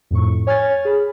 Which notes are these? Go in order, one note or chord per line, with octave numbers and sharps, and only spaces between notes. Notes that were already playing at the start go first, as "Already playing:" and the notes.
F2 A2 C#6
C#5 G#5 F6 G#6 A6
G#4 B5